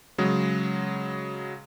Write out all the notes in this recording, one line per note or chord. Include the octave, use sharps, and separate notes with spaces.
C#3 F#3 G#3